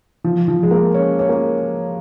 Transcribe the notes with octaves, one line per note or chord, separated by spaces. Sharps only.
F3
F3
G#3
A#3
C#4
C#4
A#3